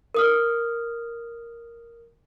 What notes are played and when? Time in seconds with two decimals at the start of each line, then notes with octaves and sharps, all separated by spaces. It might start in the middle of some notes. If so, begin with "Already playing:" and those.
0.14 A#4 D#6 F6